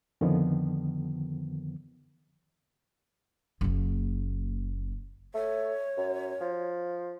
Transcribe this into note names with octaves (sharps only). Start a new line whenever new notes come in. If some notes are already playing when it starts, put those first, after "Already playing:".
F2 D3 D#3 F3 B3
F#1 A#3
A3 C#5
F#2
F3